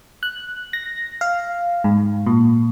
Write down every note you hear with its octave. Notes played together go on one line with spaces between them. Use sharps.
F#6
A#6
F5
G#2
A#2